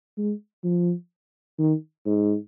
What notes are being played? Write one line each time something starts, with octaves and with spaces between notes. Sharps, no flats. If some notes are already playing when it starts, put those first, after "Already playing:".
G#3
F3
D#3
G#2